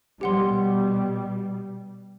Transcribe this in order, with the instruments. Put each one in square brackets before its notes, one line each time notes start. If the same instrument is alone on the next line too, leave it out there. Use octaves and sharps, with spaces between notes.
[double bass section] B2 G3 [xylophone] G4 F#5 C6